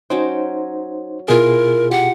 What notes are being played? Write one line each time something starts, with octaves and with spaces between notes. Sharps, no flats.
F#3 C#4 D#4 C5 G5
B2 E4 F4 G#4 A#4
G4 F#5